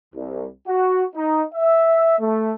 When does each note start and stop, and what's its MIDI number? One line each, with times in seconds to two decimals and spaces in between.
0.14 0.47 36
0.67 1.03 66
1.14 1.43 63
1.54 2.18 76
2.19 2.52 57